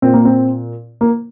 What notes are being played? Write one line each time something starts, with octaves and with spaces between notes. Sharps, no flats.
A#2 C4
A#3
C4
A#3